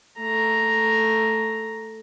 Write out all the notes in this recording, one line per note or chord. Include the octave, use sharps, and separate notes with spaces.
A3 A#5